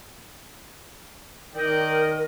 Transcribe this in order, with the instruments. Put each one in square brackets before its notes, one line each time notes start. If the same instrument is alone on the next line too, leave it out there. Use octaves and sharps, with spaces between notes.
[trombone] D#3 [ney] A#4 [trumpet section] D5 D#5 G5